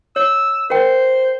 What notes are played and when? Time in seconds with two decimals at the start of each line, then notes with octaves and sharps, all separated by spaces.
0.16 C#5 E6
0.70 A#4 C5 G5